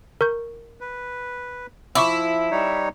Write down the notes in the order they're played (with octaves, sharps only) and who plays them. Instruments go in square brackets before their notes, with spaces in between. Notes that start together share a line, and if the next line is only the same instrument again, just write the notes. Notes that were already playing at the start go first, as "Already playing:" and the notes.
[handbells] A#4 C#6 G6
[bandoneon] B4
[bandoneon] F3 [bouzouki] E4 [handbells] C#6 D6 E6
[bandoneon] G3 D#4 C#5